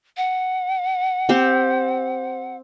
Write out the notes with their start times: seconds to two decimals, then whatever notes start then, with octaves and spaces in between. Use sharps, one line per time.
0.17 F#5
1.29 C4 G4 C5